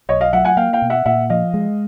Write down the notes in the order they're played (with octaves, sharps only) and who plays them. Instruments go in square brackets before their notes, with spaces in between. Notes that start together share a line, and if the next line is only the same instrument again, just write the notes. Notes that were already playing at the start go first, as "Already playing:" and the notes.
[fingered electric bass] B1 [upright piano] C#5 D#5
[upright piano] D#5 F5
[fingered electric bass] F#3 [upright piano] E5 F#5
[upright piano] F#5 G#5
[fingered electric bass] A#3 [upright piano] F5 G5
[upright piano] F5 G5
[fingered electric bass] B2
[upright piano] E5 F#5
[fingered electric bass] A#2 [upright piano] E5 F#5
[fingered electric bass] F3 [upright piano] D#5 F5
[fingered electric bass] G#3